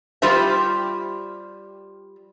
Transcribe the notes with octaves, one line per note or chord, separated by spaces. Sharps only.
G3 F4 G4 C5 E5